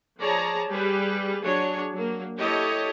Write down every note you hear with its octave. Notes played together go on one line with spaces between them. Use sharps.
F3 G#4 C#5 D5 A5 A#5
G3 G4 G#4 B4
F#3 D4 G#4 C#5
F#3 A#3
E4 G4 A4 C#5 D#5